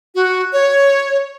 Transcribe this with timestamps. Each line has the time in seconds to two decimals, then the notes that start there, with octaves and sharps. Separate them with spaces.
0.15 F#4
0.53 C#5